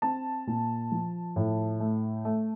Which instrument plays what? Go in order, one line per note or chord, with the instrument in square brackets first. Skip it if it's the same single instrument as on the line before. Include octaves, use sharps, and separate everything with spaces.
[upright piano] C4 A5
A#2
F3
A2
A3
A3